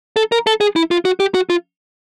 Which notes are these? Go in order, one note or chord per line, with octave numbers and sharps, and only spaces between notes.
A4
A#4
A4
G#4
E4
F4
F#4
G4
F#4
F4